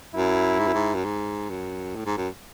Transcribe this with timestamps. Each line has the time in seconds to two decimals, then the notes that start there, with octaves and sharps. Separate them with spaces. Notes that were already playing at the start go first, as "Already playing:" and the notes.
0.14 F#2 E4
0.59 G#2
0.67 F#2
0.74 G#2
0.95 F#2
1.05 G#2
1.50 F#2
1.96 A2
2.06 G#2
2.17 F#2